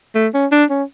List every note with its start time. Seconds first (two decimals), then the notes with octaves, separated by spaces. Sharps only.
0.15 A3
0.34 C#4
0.52 D4
0.70 C#4